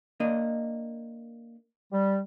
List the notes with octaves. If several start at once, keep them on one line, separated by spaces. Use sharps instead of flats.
A#3 D4 D#5
G3